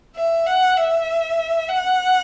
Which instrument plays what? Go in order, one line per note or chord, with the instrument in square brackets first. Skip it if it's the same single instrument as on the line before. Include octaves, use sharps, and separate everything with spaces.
[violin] E5
F#5
E5
F#5